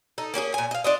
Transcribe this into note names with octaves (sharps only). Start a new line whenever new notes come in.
D#4 A4
A#3 C#4 F#4 G#4
A#2 G#5
D#5 F5
D4 F4 D#5